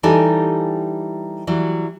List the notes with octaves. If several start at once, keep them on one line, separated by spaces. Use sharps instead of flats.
E3 G3 D#4 G4 A4 G#5
E3 F#3 G3